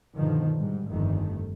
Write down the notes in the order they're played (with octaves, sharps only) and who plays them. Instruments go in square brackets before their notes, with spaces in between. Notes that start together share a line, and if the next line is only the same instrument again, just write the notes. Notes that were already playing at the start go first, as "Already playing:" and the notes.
[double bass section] G2 B2 D3 D#3 F3
G#2 G3
G1 F2 D#3 A3